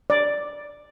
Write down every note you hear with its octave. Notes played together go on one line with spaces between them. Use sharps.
D5